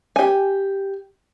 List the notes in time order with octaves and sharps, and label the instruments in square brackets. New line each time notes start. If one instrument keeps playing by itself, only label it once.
[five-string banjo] G4 G#5